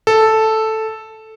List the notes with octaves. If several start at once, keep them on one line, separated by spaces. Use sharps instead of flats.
A4